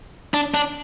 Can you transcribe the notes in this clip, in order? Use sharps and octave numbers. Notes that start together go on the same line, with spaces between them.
D4
D4